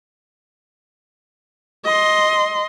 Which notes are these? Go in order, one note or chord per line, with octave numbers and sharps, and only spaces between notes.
D#5 C6